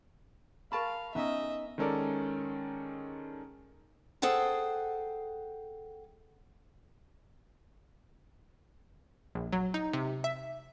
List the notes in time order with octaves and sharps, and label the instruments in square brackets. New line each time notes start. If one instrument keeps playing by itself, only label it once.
[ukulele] A#4 A5 B5 [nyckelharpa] F5 [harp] C#6 A6
[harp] B3 C#4 D#4 [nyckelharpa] D#5 E5
[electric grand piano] D#3 G#3 C#4 A4 A#4 D5
[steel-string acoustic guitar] G#4 A4 C5 F#5 G5
[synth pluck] A#1
F#3
D#4
C3
E5